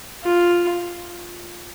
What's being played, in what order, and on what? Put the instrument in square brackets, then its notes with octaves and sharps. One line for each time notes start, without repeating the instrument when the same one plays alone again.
[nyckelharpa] F4